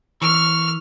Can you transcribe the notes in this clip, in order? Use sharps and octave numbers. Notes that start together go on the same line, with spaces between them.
E3 C#6 F6